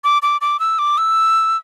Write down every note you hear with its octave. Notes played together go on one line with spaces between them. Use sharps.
D6
D6
D6
E6
D6
E6